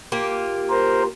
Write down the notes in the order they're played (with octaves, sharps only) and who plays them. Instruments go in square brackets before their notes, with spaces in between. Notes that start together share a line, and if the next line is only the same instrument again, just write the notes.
[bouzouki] A#3 F4 G4
[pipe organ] A#4 C5